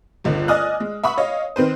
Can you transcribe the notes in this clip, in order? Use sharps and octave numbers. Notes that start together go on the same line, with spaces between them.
G1 C#2 D3
D5 D#5 G#5 D#6 F6 F#6
G#3
E5 F#5 B5 C#6 D#6
C#5 D#5 F5
D#3 C4 B4 C5